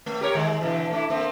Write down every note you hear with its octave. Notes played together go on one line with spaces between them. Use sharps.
A3
G4 A#4 C#5
D#3 G#3
B2 D3 E3
A3 D4 E4
A3 A#3 C4